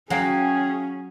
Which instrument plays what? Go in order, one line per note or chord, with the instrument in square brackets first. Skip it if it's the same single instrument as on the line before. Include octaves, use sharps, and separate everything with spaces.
[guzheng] F#3 [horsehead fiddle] C#4 [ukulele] F#4 F5 G5 [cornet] G#4